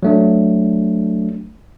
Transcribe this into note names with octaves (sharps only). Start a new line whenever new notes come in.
F#3 A3 D4